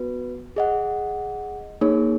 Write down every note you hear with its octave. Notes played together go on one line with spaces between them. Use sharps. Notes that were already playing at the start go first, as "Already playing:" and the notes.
Already playing: B3 F#4 B4
G#4 D#5 F#5
A#3 D#4 G#4 C#5